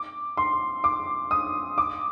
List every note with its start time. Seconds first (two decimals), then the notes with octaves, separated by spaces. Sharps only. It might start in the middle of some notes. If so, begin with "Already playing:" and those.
Already playing: D6
0.37 C6
0.84 D6
1.31 D#6
1.78 D6